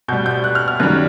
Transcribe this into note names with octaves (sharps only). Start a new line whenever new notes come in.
B2 G3 G6
G6
F#6
F6
F6
F#2 D#3 G3 F#6